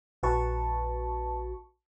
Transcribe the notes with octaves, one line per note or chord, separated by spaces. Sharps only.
A#1 F#4 B4 A5 C#6